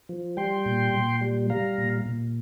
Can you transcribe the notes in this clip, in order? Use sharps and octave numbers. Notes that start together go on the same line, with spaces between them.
F3
G3 G5 C6
A#2
A#2
G3
G3 F5 A#5
A#2
A#2